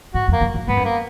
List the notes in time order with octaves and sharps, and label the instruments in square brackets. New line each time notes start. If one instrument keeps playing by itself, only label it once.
[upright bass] G#2 [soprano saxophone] F#4
[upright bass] F2
[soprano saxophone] A#3
[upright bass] F#2
F#2
[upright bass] G#2 [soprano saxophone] B3
[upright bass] F#2
[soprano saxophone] A#3